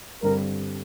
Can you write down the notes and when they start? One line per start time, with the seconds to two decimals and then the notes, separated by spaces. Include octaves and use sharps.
0.22 G2 D3 G3 C4 A#4